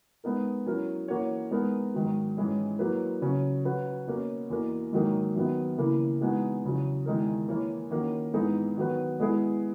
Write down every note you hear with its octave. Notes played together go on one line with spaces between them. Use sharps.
G#3 B3 D#4 A#4
F#3 C#4 E4 A#4
E3 A#3 C#4 F#4 C#5
G#3 B3 D#4 A#4
G#2 D#3 F#3
G#2 E3 G#3 C#4 E4
F#3 A#3 E4 B4
C#3 F#3 C#4
F#3 C#4 F#4 B4
B2 A#3 C#4
E2 B2 A#3
G#2 D#3 F#3 A#3 D#4
F#2 D#3 F#3 B3
C#3 E3 A#3 E4
E3 G#3 B3 D#4 F#4
E2 C#3 F#3
E2 D#3 G#3 D#4 A#4
E3 A#3 E4 A#4 C#5
D#3 A#3 C#4 F#4
G#2 E3 B3 D#4 G#4
D#3 F#3 B3 F#4 B4
G#3 B3 E4 G#4